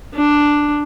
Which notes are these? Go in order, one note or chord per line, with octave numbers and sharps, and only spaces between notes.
D4